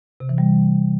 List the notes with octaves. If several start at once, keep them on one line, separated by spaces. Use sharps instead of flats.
C3
E3
G3